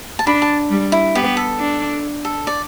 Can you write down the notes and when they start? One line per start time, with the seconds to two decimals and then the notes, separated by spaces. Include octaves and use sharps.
0.19 A5
0.26 D4 B5
0.42 A5
0.70 G3
0.92 E4
1.15 B3 G4
1.37 A4
1.59 D4
2.25 A4
2.47 D5